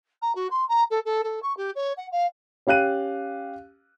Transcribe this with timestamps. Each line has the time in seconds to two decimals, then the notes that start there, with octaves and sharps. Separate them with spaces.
0.22 A#5
0.35 F#4
0.51 C6
0.69 A#5
0.91 A4
1.05 A4
1.24 A4
1.43 C#6
1.57 G4
1.75 C#5
1.97 F#5
2.12 F5
2.67 C#4 G4 F5 F#6 D#7